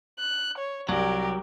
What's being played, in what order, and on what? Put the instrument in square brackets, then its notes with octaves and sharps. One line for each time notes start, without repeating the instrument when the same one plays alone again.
[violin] F#6
C#5
[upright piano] C2 [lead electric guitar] F#3 [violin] G4 A#4